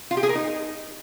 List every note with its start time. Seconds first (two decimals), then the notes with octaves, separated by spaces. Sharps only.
0.11 F4
0.17 G4
0.23 G#4
0.29 A#4
0.35 D#4